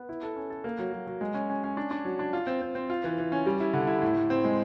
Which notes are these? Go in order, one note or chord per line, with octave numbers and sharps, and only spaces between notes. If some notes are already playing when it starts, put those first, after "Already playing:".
Already playing: B3
E4
A4
C#4
A4
A#3
F#3
F#3
F#3
G#3
C#4
C#4
C#4
D4
D4
F#3
D4
F4
C4
C4
C4
F4
E3
E3
C#4
G3
E4
D3
E4
A2
A2
C4
G#3